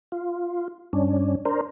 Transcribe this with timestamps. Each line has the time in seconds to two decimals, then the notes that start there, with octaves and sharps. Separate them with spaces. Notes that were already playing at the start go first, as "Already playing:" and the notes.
0.12 F4
0.93 G2 C#4 D4
1.45 D4 A#4 C5